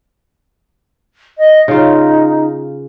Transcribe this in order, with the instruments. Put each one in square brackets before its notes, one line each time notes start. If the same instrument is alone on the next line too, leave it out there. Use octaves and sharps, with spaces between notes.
[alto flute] D#5
[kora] C#3 F4 [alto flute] D#4